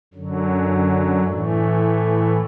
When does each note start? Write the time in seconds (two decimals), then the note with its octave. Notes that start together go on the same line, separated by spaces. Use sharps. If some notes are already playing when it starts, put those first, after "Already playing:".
0.14 F#2 D3 F#3
1.23 A2 E3 A3